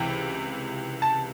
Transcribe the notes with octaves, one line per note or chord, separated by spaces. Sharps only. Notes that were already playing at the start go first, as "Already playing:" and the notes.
Already playing: C#2 C3 E3 G5
A5